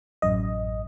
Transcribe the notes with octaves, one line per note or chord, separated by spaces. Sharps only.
A1 F#2 D#5